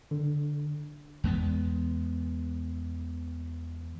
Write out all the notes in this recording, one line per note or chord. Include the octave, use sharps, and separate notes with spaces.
D3
E2 G#3 B3